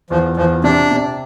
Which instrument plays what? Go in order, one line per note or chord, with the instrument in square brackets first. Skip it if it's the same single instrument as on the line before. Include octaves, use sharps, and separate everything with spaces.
[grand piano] E2 [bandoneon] F3
[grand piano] E2 [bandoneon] F3
[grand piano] C3 [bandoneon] D4
[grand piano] C3